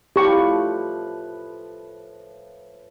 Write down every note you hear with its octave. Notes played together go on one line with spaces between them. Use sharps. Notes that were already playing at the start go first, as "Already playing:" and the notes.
A2 F3 G4 B4 C#6